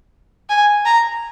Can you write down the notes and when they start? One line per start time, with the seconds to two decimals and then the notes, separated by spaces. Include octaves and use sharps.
0.49 G#5
0.85 A#5